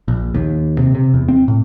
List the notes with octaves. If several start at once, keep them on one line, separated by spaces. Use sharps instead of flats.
A#1
D#2
C3
C3
E2
C4
A2